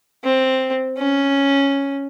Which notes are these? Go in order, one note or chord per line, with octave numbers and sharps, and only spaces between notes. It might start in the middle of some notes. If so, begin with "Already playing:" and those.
C4
C#4